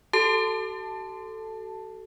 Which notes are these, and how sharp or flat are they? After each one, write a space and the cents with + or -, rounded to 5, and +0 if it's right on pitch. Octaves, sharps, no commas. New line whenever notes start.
F#4 +45 A4 +0 A5 +0